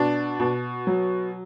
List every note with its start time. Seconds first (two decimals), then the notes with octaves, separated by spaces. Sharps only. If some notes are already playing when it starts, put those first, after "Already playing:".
Already playing: B2 D4
0.40 B2
0.87 F#3